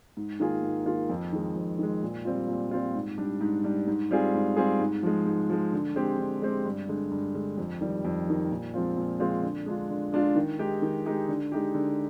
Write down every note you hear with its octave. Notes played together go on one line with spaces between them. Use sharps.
G#2
D#3 A#3 F4 G#4
G#2
D#3 A#3 F4 G#4
F2
D#3 G#3
F2
D#3 G#3
A#2
G3 C4 F4
A#2
G3 C4 F4
G#2
G3 D4
G#2
G3 D4
G#2
G3 C4 F4 G#4
G#2
G3 C4 F4 G#4
G#2
F3 G#3
G#2
F3 G#3
D3
G#3 C4 G4
D3
G#3 C4 G4
G2
D3 G#3
G2
D3 G#3
F2
D#3 G3
F2
D#3 G3
A#2
F3 G#3 C4 F4
A#2
F3 G#3 C4 F4
D3
G#3 D4 F4
D3
G#3 D4 F4
D#3
G#3 D#4 G4
D#3
G#3 D#4 G4
D3
G#3 D#4 G4
D3